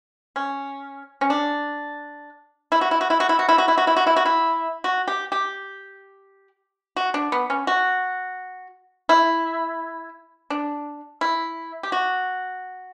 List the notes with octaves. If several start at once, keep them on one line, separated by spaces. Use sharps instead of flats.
C#4
C#4
D4
E4
F#4
E4
F#4
E4
F#4
E4
F#4
E4
F#4
E4
F#4
E4
F#4
E4
F#4
E4
F#4
G4
G4
F#4
D4
B3
C#4
F#4
E4
D4
E4
G4
F#4